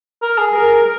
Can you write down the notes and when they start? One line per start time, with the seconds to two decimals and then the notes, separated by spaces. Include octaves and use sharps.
0.22 A#4
0.38 G#4
0.53 A#4